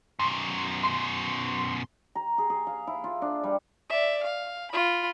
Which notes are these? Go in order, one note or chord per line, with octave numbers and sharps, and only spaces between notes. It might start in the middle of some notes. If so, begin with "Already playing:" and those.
F#2 B2 C6
C6
A#5
G#4
G#4
F5
E4
F4
D4
G3
D5 E5
F5
F4 B5